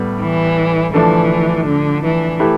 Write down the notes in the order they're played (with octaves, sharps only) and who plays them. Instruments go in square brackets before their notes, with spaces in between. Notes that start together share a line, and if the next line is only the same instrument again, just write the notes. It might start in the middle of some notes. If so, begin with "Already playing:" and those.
Already playing: [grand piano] A2 G3 B3
[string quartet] E3
[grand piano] D3 F3 A3 D4 A4 [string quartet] E3
[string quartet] D3
E3
[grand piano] A3 E4 G4 B4